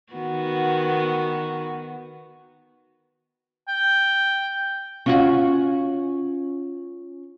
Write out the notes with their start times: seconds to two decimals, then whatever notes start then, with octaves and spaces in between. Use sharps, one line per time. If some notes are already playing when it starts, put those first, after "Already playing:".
0.13 D#3 B3 F#4
3.68 G5
5.06 C#4 F4 F#4